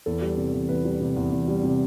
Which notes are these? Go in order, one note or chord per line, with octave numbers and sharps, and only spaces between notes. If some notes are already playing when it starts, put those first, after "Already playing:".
E2 A4
G3
C3
E2
E2 B4
G3
C3
E2
E2
G3
C3